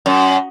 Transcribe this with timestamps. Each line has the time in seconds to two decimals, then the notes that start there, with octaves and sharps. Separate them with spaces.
0.06 F#2